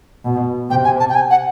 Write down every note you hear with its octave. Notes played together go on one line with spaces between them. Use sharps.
B2
C3 G5
G#5
A5
G5
G#5
F#5